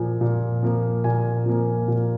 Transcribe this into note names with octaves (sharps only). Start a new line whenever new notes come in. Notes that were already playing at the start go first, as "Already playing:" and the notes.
Already playing: A#2 F3 A#3 G#5
A#2
F3 A#3
A#2 G#5
F3 A#3
A#2